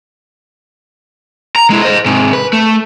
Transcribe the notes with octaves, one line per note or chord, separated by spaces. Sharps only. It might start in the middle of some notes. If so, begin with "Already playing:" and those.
A#5
G#3 E4
C5 D#5
G#2 C3
B4
A3